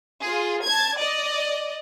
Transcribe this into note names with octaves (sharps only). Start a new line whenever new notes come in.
F4 G#4
A5 G#6
D5 D#5